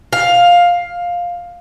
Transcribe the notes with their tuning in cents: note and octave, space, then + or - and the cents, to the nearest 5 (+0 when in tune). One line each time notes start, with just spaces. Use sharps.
F5 +10